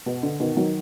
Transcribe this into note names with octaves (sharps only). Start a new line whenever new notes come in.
B2
D3
B2 D#3
D#3 F#3